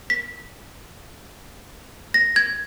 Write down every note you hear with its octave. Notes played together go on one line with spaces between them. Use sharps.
B6
A#6
G#6